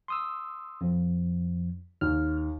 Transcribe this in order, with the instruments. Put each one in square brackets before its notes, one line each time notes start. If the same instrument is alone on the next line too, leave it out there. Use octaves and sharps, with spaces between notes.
[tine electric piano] C6 D#6 E6
F2 F3
[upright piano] D#2 [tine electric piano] F6